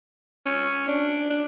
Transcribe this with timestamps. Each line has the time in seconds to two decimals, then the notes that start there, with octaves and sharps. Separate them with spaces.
0.46 C#4
0.88 D4
1.30 D4